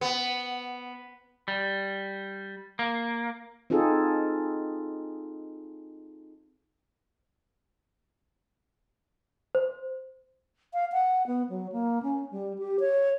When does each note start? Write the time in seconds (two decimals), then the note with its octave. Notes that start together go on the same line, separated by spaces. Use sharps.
0.01 B3
1.48 G3
2.79 A#3
3.70 C4 D#4 F4 G#4 A4
9.55 C5
10.73 F5
10.92 F#5
11.27 B3
11.49 F#3
11.72 A#3
12.03 C#4
12.31 G3
12.58 G4
12.80 C#5